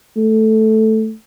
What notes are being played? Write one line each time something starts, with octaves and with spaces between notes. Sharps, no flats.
A3